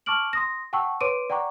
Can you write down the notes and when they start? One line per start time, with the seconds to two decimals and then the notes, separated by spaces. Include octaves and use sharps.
0.06 A5 C#6 D6 F6 D7 F#7
0.33 C6 D#6 A#6
0.73 F#5 G5 A5 C#6 E6
1.01 B4 C#5 C6 D6 D7 D#7
1.30 D5 F#5 G5 A#5 C#6 D6